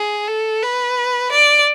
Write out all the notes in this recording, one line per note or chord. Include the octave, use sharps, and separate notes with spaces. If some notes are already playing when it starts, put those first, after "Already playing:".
Already playing: G#4
A4
B4
D5